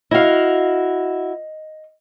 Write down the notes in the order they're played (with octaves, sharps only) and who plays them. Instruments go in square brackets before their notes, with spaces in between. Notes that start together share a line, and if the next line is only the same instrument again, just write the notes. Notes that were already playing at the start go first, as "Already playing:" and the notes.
[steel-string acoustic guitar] E4 F#4 [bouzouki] D#5 F5